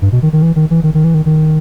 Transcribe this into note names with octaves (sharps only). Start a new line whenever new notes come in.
G2
B2
D#3
D#3
E3
D#3
E3
D#3
D#3
E3
D#3
D#3